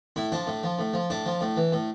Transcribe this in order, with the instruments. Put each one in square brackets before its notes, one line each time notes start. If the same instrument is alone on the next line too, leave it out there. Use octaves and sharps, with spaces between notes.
[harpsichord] A2 E4
F3 D4
A2
F3
A2
F3
A2 D4
F3
A2
E3
A2